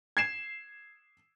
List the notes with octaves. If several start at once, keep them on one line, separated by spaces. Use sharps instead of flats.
G#6 C7 E7